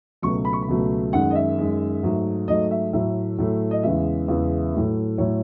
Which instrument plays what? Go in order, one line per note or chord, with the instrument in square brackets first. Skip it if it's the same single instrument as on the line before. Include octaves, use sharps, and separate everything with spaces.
[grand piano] C#2 B2 F#3 A3 C#6
B5
C#6
B5
C#2 B2 F#3 A3
F#2 D#3 G#3 F#5
D#5
E5
F#2 D#3 G#3
G#2 F#3 A3
G#2 F#3 A3 D#5
E5
A2 F#3 A3 E5
A2 F#3 A3
D#5
E2 C#3 E3 G#3 E5
E2 C#3 E3 G#3
A2 F#3 A3
A2 F#3 A3 C#5